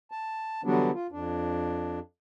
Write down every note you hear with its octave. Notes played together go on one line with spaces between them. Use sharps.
A5
D3 E3 F#3 G3 B3 D4
F4
F2 D4